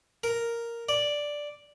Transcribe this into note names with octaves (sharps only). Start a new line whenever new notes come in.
A#4
D5